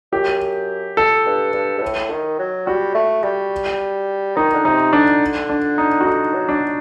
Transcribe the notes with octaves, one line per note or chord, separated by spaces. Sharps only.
F#2 G4
A4
G2
G2
G2
A2
D#3
F#3
G3 F#4
A3
G3
D#3 D#4
D3
C3 D#4
D3 D4
D4
D#4
F#4
D3 D#4
F#3
D4